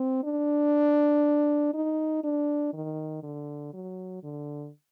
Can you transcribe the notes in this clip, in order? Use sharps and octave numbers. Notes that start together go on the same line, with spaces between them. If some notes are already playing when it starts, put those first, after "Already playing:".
Already playing: C4
D4
D#4
D4
D#3
D3
F#3
D3